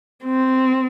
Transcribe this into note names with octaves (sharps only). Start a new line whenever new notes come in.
C4